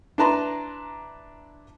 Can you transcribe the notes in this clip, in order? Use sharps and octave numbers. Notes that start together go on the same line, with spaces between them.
D4 E4 B4 A5 A#5 C6